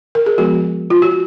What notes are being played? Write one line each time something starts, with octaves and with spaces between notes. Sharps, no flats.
A#4
G#4
F3 G#3 B3 F#4
F4
F#4